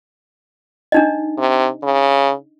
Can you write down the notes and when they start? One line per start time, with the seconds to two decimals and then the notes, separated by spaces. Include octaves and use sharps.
0.92 D4 D#4 D#5
1.38 C3
1.83 C#3